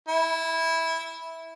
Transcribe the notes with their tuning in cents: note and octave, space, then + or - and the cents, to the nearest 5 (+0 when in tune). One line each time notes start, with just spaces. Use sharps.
E4 -10